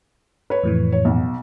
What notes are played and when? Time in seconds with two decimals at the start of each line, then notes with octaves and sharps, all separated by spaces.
0.50 B4 C#5
0.63 F2 A2 E3
0.92 C#5
1.05 B1 B2